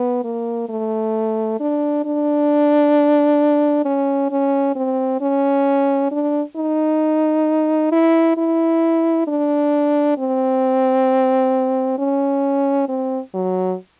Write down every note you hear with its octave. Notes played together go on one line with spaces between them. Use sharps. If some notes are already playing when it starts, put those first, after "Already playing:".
Already playing: B3
A#3
A3
D4
D4
C#4
C#4
C4
C#4
D4
D#4
E4
E4
D4
C4
C#4
C4
F#3